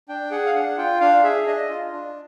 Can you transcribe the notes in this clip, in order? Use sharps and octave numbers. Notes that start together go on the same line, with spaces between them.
D4 G5
G#4 F#5
F5
D4 F#5
F4 G5
D4 F5
G#4 E5
D4 D#5
F4
D4